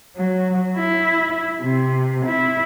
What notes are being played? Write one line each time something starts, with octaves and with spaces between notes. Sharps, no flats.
F#3
E4
C3
E4